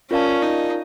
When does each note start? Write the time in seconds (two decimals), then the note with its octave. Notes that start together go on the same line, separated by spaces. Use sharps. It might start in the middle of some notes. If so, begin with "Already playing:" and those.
0.11 C#4 F4 A#4 D5 F5 A5
0.42 D#4